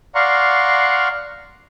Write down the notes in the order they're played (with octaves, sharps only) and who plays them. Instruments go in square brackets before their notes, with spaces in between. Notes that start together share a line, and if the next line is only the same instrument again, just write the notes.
[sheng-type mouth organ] D5 F5 F#5 A#5 C6 C#6